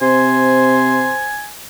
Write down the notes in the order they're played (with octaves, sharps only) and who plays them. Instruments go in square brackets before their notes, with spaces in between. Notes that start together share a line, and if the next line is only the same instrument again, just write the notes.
[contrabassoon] C3 [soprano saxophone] C5 [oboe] G#5